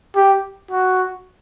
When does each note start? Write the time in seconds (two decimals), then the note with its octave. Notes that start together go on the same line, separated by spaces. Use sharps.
0.15 G4
0.71 F#4